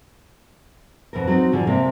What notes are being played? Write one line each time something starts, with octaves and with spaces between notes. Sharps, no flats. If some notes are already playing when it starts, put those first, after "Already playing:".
F2 B2 A#4
F#3 C4 D#4
F2 D3 F3 G#4
C3 G#3 A#3